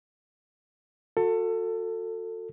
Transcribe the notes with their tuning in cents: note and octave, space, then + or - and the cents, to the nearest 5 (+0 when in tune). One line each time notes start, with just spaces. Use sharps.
F#4 -35 A4 +25